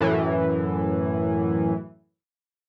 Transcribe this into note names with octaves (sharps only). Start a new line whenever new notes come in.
F#2 A2 E3